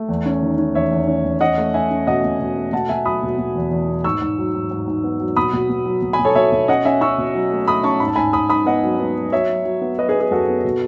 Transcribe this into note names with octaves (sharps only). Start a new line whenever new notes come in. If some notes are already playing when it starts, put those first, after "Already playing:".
Already playing: A3
E2
C#4
D#3
C#4
E2 C#5 E5
E2
C#4
E2
C#4 D#5 F#5
A3
C#4 E5 G#5
C#4
B2 D#5 F#5
B2
B2
A3
B2 F#5 A5
B2 E5 G#5
F#3 B5 D#6
B2
B2
E2
E2
B3
G#2 C#6 E6
G#2
F#3
G#2
G#2
G#2
B3
F#3
B2 B5 D#6
B2
B2
F#3
B2
G#5 B5
B2
A4 C#5
B2 C#5 E5
B2
C#4 D#5 F#5
C#4 E5 G#5
C#4 C#6 E6
B2
F#3
A3
A3 B5 D#6
C#4 A5 C#6
G#2 B5
A5
G#2 G#5 B5
G#2 B5 D#6
G#2 B5 D#6
B3 D#5 F#5
F#3
B3
F#3
F#3 C#5 E5
F#3
F#3
B3
F#3 B4 D#5
G#4 B4
B3
G#4 B4
F#2 F#4 A4
B3
B2